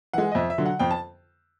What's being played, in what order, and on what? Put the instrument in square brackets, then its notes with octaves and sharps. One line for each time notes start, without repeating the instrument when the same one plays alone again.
[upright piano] E3 G#3 F#5
D#5
F2 E5
E5
D3 F#3
F#5
F2 G5
A5